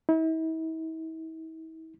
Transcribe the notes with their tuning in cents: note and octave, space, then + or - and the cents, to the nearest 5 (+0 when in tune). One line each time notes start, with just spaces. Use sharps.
E4 -45